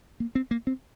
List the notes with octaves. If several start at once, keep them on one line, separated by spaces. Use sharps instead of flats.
A#3
C4
A#3
C4